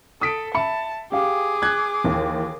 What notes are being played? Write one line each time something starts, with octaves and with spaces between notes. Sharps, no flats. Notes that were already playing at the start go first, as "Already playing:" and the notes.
A4 D#6 B6 D7
E5 A5 B5 C#7
G4 G#4 F5 D6
F#6 G#6
D#2 E3